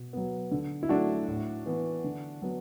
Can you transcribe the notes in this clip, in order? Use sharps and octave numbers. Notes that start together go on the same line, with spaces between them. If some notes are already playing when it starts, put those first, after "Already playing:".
Already playing: B2
F#3 B3
D3
E4
F#3 A3 D4 F#4
A2
E3 B3
D3
F#3 B3